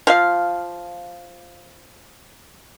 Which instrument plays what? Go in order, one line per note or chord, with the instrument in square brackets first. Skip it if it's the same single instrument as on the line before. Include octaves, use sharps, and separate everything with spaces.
[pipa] F3 F4 F5